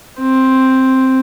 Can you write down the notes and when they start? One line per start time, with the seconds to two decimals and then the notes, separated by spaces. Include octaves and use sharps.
0.20 C4